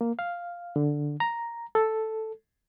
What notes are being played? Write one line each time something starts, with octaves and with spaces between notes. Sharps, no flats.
A#3
F5
D3
A#5
A4